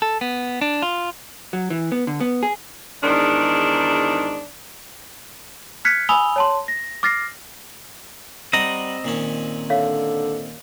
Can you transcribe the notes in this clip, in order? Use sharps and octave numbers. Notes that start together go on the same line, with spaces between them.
A4
B3
D4
F4
F#3
E3
B3
D3
B3
G#4
E2 G#2 D#3 D4
F6 F#6 G#6 B6 C#7
G#5 B5 D#6 E6 F7 G7
C#5 A5 C6
A#6
D6 F6 A6 A#6 C7
G3 C4 D#5 F#5 G5 A#5
A#2 D#3 C#4
D3 C#5 E5 F5